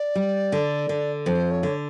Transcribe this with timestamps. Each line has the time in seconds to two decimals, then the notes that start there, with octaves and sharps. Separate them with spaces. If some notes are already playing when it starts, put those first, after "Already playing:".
Already playing: D5
0.15 G3
0.52 D3
0.89 D3
1.26 F2 C5
1.51 C#5
1.63 D3